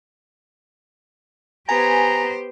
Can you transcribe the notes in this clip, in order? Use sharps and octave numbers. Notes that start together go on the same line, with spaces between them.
B3 G4 C5 G#5 A#5